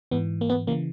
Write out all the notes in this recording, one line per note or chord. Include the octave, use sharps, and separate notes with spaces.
G#2 E3 B3
A#3
B3
C#3 E3 A#3